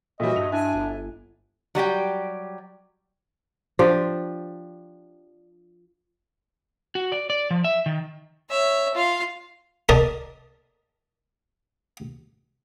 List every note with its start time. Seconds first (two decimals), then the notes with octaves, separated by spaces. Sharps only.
0.20 A#2 E3 G3 F#4 D#5 E5
0.36 G2 F7
0.52 G2 D4 E4 G#5
0.74 G1
1.75 F#3 G3 G4 G5
3.79 F3 D4 G4
6.95 F#4
7.12 D5
7.30 D5
7.51 F3
7.64 E5
7.86 D#3
8.49 C#5 E5
8.95 F4 F5
9.89 A#4 D5 D#5 A5